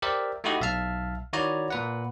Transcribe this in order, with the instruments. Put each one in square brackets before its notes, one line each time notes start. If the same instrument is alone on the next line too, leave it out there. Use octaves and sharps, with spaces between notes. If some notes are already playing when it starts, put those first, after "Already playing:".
[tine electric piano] G4 A#4 C5 D5 E5
A3 D#4 E4 F#4 G4 D#5
B1 E5 F5 A5 F6
D#3 E4 F#4 C#5 D5 A#5
A#2 B4 F#5